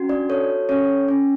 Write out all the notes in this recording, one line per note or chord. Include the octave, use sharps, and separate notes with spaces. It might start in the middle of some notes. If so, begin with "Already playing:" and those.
Already playing: C#4 F#4
D4 D5
A4 C#5
C#4 C#5
C#4